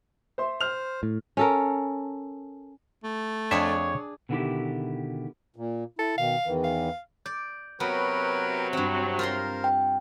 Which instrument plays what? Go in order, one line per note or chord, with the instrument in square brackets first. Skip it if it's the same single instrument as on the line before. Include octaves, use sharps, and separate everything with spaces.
[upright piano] C5 E5 C6
[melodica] C5 [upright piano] F6 F7
[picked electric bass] A2
[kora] C#4 A4 A#4
[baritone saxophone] A3
[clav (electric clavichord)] F2 E5 [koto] D4 G#4 [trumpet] C#5
[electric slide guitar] B2 D3 D#3 A#3 E4 G4
[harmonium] A#2
[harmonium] E4 [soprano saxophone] A4
[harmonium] B2 D#3 [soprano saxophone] F5
[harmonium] E2 D#3 E3
[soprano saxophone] F5
[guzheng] D5 [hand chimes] G6
[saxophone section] C3 F#3 [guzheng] B3 [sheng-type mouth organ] A#4 B4 G5
[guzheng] G2 C4
[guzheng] F4 A#5 C6 [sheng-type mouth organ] A#4 C5
[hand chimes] G5